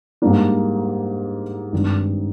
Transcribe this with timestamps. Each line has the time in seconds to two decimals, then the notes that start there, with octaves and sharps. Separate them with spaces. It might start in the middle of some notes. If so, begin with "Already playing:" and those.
0.22 G#2 G3 A#3 D4
1.73 G#1 G2 D#3